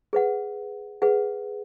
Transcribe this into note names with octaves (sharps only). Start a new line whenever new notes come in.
G#4 B4 F#5
G#4 B4 F#5